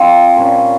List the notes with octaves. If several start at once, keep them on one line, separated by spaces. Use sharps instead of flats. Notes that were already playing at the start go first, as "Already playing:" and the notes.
Already playing: F3 C4 F4 C5
A#2 G3 C#4 F4